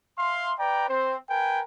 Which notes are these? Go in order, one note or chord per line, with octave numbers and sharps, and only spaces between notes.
E5 F5 C6
B4 D5 G5 A#5
C4 C5
A#4 B4 G5 G#5